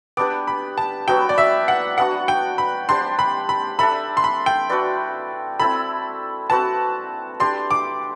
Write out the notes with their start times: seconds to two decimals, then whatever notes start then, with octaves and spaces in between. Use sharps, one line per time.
0.17 B3 D4 G4 B4 D6
0.47 B5
0.78 A5
1.08 F#3 B3 F#4 B4 G5
1.29 D5
1.38 E5
1.68 F#5
1.98 B3 D4 F#4 F#5
2.28 G5
2.58 B5
2.89 D4 G4 C5 C6
3.19 B5
3.49 B5
3.79 D4 A4 E5 B5
4.17 C6
4.24 B5
4.46 G5
4.69 D4 F#4 B4 D5
5.60 C4 E4 A4 B5
6.50 C4 F#4 B4 A5
7.40 D4 G4 D5 C6
7.71 D6